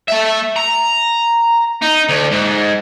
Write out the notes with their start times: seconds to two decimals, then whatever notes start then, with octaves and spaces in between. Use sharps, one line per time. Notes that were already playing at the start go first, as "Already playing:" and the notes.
0.08 A3 E5
0.56 A#5
1.82 D#4
2.09 D2
2.31 G#2